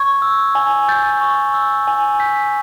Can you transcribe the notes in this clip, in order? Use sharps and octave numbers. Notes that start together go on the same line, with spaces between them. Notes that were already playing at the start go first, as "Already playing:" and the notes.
Already playing: C#6 G#6
E6
G#5
G6 A6
C#6
E6
G#5
G6 B6